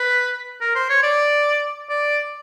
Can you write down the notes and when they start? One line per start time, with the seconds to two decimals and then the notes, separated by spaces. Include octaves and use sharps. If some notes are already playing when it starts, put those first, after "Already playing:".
Already playing: B4
0.61 A#4
0.75 C5
0.89 C#5
1.03 D5
1.89 D5